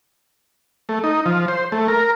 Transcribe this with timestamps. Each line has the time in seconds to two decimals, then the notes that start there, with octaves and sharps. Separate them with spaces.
0.89 A3
1.04 D#4
1.26 F3
1.48 C5
1.72 A3
1.88 A#4